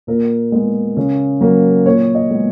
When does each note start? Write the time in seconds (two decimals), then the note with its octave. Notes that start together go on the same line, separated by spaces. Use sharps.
0.07 A#2 A#4
0.52 G#3 B3
0.97 C#3
1.41 F#3 A#3
1.86 A#2 C#5
2.14 D#5
2.30 G#3 B3